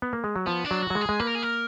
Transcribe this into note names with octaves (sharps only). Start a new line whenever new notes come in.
B3
A#3
G#3
F#3
F3 B3
D4
F#3
F#4
F#3
G#3
G#4
G#3
A#3 B4
A#4
G#4
A#4